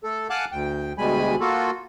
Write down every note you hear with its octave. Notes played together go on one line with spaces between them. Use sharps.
A3 A4
F5 F#5 G#5 A5 D6 F#6
D2 G5
D2 B2 G3 G#3 G#5 B5
A#3 F4 F#4 A4